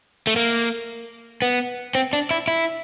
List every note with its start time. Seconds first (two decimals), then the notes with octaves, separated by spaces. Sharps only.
0.27 A3
0.36 A#3
1.42 B3
1.95 C4
2.13 D4
2.31 E4
2.48 E4